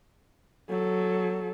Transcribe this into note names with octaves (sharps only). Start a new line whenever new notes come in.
F#3 A4